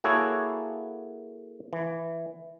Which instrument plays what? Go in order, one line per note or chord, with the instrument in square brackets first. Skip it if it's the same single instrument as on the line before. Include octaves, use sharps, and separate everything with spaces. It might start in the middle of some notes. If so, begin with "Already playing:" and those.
[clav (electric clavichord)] A#3 E4 F#4 G#4 A4 C#5
E3